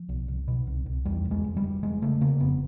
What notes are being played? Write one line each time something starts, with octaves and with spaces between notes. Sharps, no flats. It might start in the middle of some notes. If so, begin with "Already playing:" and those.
Already playing: F3
B1
C2
B2
C2
C2
E2 G3
F1
G#3
F1
G3
F1
F1 G#3
C#3 A3
C#3 A#3
F1 B3